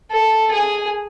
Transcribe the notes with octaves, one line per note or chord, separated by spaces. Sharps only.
A4
G#4